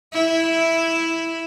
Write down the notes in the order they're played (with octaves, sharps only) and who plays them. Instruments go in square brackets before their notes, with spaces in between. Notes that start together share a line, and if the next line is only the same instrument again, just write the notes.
[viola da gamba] E4